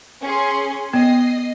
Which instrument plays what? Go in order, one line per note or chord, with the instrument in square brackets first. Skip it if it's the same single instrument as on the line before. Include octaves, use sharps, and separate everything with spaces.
[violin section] C#4 G#4 C6
[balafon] B3 [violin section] D#5 C7